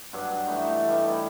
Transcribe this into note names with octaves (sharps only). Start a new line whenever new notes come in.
G2 F#3 D4
E3 A3 D#4
A4
G2 G3 A3 B5
E4 A5 B5